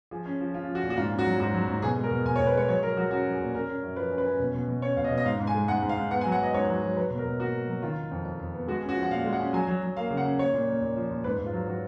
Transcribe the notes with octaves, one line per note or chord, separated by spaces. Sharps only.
F3 G#4
C#4
F3
C#4 F4
F3
F#4
A#2
F#4
G#2 F4
C#4
F#4
F#3
G#2 F#4
F#3
G#2
B2 G#4
G#3
A#4
B2
B2 G#5
C#5
B2
B4
G#3 C#5
F#3 C#5
F#3 A#4
F#3 F#4
C#4 F#4
F#3
G#4
A#2
C#4 A#4
C#4
F#2
F3 B4
C#4
B4
C#4
B2
B2
B2
C#4 C#5
B2 F5
D#5
B2
D#5
G#2 F5
G#2
G#5
G#3
G#2 F#5
G#2
F5
G#2
B3 F#5
G#5
F#3
F#5
B3 D#5
G#2 C#5
F#3
F#3
F#3 B4
B2
A#4
B2
A#3 F#4
A#3
F#3
D#3 F4
D#3
F2
F2
F2
B3
G#3 F#4
C#4
F#4
F3
F#5
A#2 F5
G#3
F#5
C#4
F#3 G#5
F#3
F#3
A#3 F5
C#3
F#5
C#4
A#3 C#5
A#2
A#3
A#2
F3
A#2
G#2 B4
G#2
F4
F#3
F#3 F#4